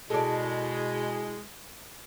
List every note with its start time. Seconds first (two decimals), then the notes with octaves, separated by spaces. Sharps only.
0.10 B2 G#3 E4 G#4 A4 D5